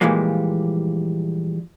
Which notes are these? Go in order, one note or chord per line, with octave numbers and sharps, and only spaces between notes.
A#2 E3 F3 G3 G#3 A#3